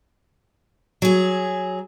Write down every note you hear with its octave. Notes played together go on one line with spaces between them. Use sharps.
F#3 G#4